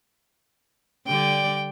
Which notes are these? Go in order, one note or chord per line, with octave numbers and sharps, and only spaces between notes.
D3 G3 D5 G5